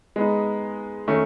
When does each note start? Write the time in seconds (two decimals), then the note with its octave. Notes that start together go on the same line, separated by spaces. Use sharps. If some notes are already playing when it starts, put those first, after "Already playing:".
0.16 G#3 B3 D#4
1.08 D#3 A3 C#4